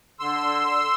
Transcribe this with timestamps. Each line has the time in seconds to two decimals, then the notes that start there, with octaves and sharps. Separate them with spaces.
0.19 D3 C6 E6